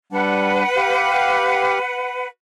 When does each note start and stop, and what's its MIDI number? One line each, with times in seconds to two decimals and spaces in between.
0.12 0.63 55
0.12 0.63 62
0.12 2.27 71
0.12 2.27 78
0.77 1.79 67
0.77 1.79 77